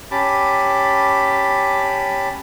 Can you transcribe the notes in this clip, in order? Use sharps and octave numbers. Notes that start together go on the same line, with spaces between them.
C#4 G4 A5 B5 D6